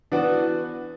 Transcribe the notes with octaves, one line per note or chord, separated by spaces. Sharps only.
E3 B3 D4 F#4